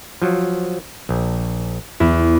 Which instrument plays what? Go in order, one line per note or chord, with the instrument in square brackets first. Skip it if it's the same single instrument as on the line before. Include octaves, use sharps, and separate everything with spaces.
[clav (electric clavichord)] F3 F#3
A#1
[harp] E2 [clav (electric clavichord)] E4